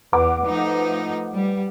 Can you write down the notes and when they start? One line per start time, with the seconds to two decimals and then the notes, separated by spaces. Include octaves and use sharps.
0.13 E2 B4 F#5 D6
0.46 F3 A3 D#4
1.34 G3